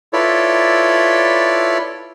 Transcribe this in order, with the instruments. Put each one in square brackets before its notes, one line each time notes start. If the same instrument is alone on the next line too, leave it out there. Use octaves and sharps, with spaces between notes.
[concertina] E4 F4 A4 B4 C#5 D5